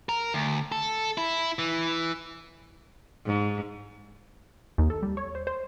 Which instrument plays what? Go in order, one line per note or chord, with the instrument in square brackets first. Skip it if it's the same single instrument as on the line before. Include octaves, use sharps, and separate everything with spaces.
[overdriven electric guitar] A#4
D2
A4
E4
E3
[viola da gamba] G#2
[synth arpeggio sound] D#2
A4
G3
C#5
C5
C5